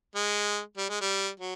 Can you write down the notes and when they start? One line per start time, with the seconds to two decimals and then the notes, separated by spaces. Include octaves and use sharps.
0.15 G#3
0.77 G3
0.89 G#3
1.01 G3
1.40 F#3